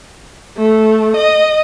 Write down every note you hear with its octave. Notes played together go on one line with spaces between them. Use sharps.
A3
D#5